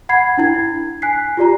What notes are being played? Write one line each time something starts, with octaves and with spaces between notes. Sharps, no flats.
F#5 B5 G#6 C7
D4 E4 G#6
G#5 F#6 B6 C7
F4 G4 D5 A#5